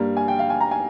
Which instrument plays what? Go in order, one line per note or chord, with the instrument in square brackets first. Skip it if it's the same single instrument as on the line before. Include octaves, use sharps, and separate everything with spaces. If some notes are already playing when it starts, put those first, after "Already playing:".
Already playing: [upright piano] G2 G3 A#3
G#5
G5
F5
G#5
A#5
G#5